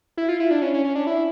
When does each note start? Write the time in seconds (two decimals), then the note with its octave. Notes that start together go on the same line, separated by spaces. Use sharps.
0.17 E4
0.29 F4
0.40 E4
0.51 D4
0.62 C#4
0.74 C#4
0.84 C#4
0.95 D4
1.07 E4